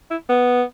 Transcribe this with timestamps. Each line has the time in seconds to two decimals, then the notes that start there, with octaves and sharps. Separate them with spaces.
0.11 E4
0.29 B3